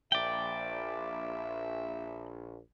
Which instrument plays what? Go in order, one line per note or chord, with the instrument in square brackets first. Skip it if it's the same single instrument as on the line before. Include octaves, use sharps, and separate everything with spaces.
[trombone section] A#1 [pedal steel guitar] D5 G5 [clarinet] E5